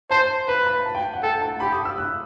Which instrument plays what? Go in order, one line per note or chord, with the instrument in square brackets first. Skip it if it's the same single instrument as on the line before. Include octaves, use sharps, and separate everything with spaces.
[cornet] C5 [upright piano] A5
[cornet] B4 [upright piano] B5
[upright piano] B5
A5
G5
F#5
[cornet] A4 [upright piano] G5
[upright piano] A5
[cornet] G4 [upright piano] B5
[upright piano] D#6
E6
F#6